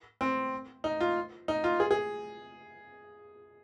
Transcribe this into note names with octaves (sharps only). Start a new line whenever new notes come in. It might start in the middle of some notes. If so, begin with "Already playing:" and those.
C4
D#4
F4
D#4
F4
G#4
G#4